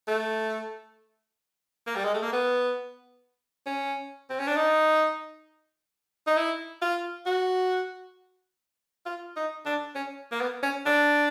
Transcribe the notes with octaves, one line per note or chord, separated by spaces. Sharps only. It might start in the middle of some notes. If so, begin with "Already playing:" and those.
A3
A#3
G3
G#3
A3
A#3
B3
C#4
C4
C#4
D4
D#4
D#4
E4
F4
F#4
F4
D#4
D4
C#4
A#3
B3
C#4
D4